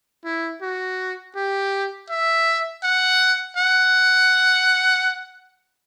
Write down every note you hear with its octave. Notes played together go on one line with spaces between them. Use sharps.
E4
F#4
G4
E5
F#5
F#5